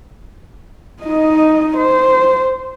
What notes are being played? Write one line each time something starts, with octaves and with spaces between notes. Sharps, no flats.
D#4 D#5
C5